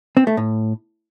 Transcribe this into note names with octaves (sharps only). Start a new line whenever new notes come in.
C4
A3
A2